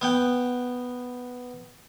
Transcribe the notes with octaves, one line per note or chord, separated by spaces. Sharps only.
B3 F#5 G5